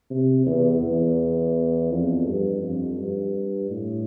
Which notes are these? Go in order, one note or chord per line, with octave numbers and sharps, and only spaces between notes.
C3
E2
E2
F2
G2
F2
G2
A2